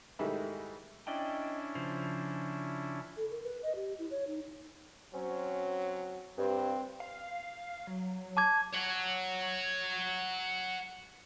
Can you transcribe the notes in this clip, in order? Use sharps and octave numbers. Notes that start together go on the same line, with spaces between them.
G#2 D#3 G3 A3 D#4 E4
C#4 D4 E4 D5 D#5 G5
C#3 F3 C5
A4
A#4
B4
D#5
G4
E4
C#5
D#4
F#3 C4 C#4
G2 C4
F5
F#3
A5 D6 G#6
C#5 F#5